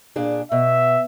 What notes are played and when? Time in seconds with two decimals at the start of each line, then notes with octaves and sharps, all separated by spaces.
0.16 A#2 D4 G#4
0.52 B2 E5